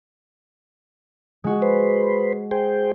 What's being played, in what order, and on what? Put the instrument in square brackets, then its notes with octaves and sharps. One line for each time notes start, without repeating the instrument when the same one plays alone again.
[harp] G#3 F#4
[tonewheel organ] B4 C5
G#4 C5 G5